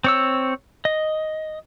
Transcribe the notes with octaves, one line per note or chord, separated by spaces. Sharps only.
C4 C#5 E6
D#5